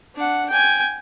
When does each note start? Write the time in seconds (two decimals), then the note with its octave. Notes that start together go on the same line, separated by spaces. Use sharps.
0.15 D4 F#5
0.49 G5 G#5